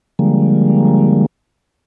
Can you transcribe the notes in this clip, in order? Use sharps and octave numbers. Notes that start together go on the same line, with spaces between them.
D3 F3 G3 G#3 A#3